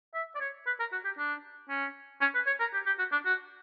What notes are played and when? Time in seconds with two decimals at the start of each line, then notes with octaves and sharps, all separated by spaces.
0.14 E5
0.35 D5
0.40 C#5
0.66 B4
0.80 A#4
0.92 F#4
1.05 G4
1.18 D4
1.70 C#4
2.21 C#4
2.35 B4
2.47 C#5
2.60 A#4
2.74 G4
2.86 G4
2.99 F#4
3.12 D4
3.25 F#4